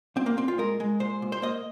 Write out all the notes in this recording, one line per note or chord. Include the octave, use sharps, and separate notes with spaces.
A#2 C4
A#3
A#2 C4
F4
G#3 A#4
G#3
A#2 C5
A#2
C5
A#3 D#5